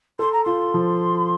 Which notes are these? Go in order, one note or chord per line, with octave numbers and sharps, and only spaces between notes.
A4 C6
A#5
F4 C6
F3